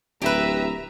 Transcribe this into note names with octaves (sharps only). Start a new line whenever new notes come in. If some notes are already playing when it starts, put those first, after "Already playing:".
D1 G4 B4 E5 A#5